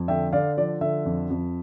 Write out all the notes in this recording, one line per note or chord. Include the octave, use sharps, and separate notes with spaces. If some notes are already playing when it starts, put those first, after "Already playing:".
Already playing: F2
D3 E5 G5
D3 D5 F5
F3 D5
D3 E5
F2
F2